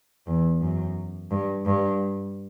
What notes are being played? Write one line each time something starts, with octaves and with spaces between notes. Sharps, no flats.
E2
F#2
G2
G2